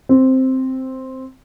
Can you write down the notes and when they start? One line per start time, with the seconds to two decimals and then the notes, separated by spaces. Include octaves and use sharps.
0.09 C4